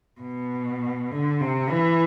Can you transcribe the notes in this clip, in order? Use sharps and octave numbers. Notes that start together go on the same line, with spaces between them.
B2
D3
C3
E3